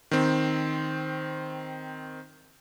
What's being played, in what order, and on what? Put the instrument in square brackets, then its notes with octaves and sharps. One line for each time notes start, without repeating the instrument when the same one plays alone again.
[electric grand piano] D#3 C4